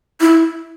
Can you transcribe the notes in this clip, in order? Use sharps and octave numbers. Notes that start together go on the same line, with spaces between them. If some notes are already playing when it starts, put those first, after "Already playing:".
E4